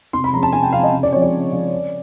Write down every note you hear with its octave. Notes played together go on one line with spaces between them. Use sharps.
C3 C6
B5
F3 G#3 C#4 A#5
A5
C3 G#5
G5
F3 G#3 C#4 F5
D#5
C#3
D5
F3 G#3 C4 C#5
D5
C#3
F3 G#3 C4
C#3